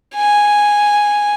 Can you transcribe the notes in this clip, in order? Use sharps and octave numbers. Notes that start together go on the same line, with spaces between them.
G#5